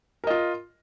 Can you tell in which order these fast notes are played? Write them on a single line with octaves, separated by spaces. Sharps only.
A#4 D#5 F4